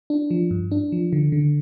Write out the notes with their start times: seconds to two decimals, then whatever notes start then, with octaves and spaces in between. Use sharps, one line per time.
0.10 D4
0.31 F3
0.51 G2
0.71 D4
0.92 F3
1.13 D3
1.32 D3